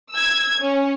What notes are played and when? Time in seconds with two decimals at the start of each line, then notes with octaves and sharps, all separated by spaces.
0.12 E6 G#6
0.61 C#4